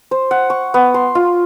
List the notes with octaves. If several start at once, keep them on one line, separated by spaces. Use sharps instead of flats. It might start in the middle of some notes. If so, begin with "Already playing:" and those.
C5
F#5
C#6
B3
C6
F4